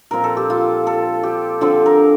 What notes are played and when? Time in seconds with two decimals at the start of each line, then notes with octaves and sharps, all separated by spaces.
0.11 A#2 F3 C4 A#4
0.24 A4
0.37 G4
0.50 F4
0.87 A4
1.23 G4
1.61 D3 F3 C4 A4
1.86 A#4